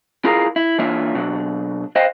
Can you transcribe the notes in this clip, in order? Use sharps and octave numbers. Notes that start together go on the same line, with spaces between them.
E4 F4 G#4 A#4 F5 A#5
E4
E3 A#3 D4 F4 C#5 E5
B2 F#3 D4
B4 C5 D#5 F5 G5